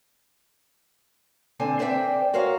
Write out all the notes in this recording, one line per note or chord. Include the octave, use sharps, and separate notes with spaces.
D3 C4 G#5
C4 C5 D5 E5 F#5 G5
F#4 A#4 C5 C#5 F5